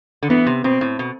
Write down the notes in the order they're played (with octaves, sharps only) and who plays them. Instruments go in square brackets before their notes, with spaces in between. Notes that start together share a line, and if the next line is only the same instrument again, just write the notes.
[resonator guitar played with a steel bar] D3
[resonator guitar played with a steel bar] E3 [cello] B3
[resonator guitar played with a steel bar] C3
[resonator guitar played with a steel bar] B2 [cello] C4
[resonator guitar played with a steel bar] A2
B2